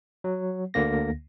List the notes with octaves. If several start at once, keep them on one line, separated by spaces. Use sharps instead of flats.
F#3
D2 D3 A#3 A#6